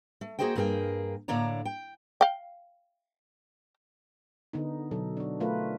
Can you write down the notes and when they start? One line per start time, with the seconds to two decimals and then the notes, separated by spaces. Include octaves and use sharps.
0.21 A3
0.39 A#3 F#4 G#4 C5 D#5 G5
0.55 G2 A#3 C#4 G#4 A#4 G5
1.28 A2 D3 A#3 C#5 D5 A#5
1.65 G5
2.21 F5 G5
4.53 D3 B3 D#4
4.91 B2 F#3 A4
5.17 D4 F#4
5.40 A3 F4 A#4 B4